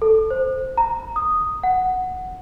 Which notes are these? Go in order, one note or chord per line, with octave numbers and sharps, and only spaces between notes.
A4
C5
A#5
D#6
F#5